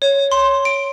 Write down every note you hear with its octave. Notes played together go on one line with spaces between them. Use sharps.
C#5
C6
D7